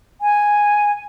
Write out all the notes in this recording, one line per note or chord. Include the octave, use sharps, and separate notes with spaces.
G#5